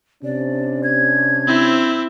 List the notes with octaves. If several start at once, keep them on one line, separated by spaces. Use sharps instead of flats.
C3 C#4 D4 D5
G#6
C4 E4